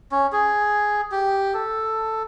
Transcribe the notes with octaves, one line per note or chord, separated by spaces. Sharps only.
C#4
G#4
G4
A4